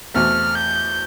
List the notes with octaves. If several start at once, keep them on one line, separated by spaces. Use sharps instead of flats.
E2 B2 A3 C4 F6
G6